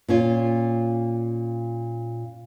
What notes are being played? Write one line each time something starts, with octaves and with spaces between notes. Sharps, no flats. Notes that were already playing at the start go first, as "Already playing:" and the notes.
A#2 C#4 F4